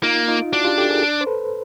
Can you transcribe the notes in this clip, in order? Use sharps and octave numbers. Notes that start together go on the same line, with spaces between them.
A#3 D#4 F4
D#4 F4
D4 E4 F#4
F4 G4
G4 A4
G#4 A#4
C5
A4 B4